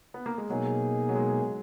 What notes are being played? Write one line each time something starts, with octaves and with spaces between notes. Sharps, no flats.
B3
A#3
G#3
B2 F#3 A#3 D#4 G#4
F#3
G#3